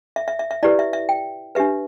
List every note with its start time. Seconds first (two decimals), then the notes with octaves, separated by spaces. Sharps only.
0.16 E5
0.28 E5
0.39 E5
0.51 E5
0.63 E4 G4 B4 D5
0.79 E5
0.93 E5
1.09 G5
1.55 D4 G4 B4 E5